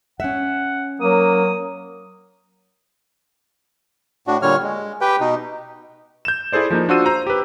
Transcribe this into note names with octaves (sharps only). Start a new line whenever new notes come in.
C#4 E5 F#5
F#3 A#3 D#6
A2 D4 F#4
A#2 D3 G3 C#5 F6
G#3
G4 B4 G5
B2 D#4
G6 E7
E4 G#4 A4 C5 D5
F3 A#3 D#4
D4 F4 F#4 C5 E6 D#7
C5 A#5
G4 B4